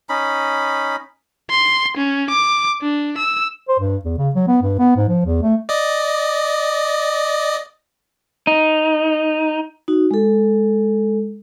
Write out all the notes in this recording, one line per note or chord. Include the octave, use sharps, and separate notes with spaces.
C#4 D#4 B5
C6
C#4
D6
D4
E6
C5
G2
E2
C#3
F#3
B3
G2
B3
G#2
F3
E2
A3
D5 D#5
D#4
D#4 F#4
G#3 A4